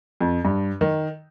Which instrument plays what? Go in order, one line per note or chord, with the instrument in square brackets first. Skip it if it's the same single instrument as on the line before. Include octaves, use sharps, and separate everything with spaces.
[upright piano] F2
G2
D#3